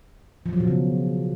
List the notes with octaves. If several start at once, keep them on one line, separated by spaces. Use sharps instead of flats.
F3
F#3
B2
C#3